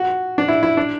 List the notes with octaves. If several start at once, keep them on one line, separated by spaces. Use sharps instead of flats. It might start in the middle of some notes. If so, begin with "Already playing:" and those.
Already playing: F#4
D4
E4
E4
D4